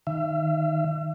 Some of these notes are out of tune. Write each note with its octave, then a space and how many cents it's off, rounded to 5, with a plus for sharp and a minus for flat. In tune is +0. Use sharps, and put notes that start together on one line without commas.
D#3 +0 E5 +45